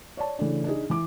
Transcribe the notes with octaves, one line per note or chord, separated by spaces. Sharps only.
C#5 D5 A5
C#3 E3 A3 D4
D4 D#4 G#4
E3 D6